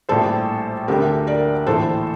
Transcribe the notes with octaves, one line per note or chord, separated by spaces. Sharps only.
A#1 A2 G3 A4 C5
D2 D3 A3 G4 A#4
A#4 D5
A#1 A2 E3 A3 A4 C5